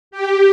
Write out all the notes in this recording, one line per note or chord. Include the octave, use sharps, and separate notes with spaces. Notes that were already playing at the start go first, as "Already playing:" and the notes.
G4